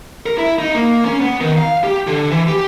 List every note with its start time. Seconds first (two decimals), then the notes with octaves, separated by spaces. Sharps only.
0.26 A#4
0.38 E4
0.58 D#4
0.74 A#3
1.05 C#4
1.21 B3
1.40 D#3
1.57 F5
1.84 G4
2.07 D3
2.31 E3
2.48 G4